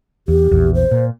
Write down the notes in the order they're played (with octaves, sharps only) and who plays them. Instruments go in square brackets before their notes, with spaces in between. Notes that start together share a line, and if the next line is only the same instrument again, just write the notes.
[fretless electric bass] E2 [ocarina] G4
[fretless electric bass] A#1 E2
[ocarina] C5
[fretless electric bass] A#2